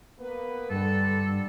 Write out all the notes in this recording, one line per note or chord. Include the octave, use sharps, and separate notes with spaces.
A#3 B3 B4
G2 D3 G3 A4